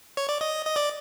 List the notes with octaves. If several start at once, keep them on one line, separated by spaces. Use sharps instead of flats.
C#5
D5
D#5
D#5
D5